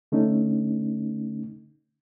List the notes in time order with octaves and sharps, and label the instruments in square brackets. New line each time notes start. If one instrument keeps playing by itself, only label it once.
[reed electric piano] D3 A3 C#4 D#4